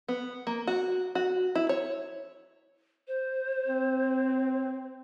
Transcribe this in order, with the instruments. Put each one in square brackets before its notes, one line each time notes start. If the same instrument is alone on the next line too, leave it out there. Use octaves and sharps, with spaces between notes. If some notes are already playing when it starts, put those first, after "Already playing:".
[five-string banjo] B3
A#3
F#4
F#4
E4
C#5
[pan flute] C5
[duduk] C4